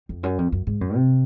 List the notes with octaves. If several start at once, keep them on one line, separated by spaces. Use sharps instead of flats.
F2
F#2
F2
F#2
G#2
F#2
C3